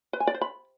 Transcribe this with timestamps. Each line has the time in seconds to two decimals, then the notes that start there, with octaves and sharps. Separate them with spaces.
0.13 B4
0.20 G#5
0.27 D5
0.34 C5
0.41 B5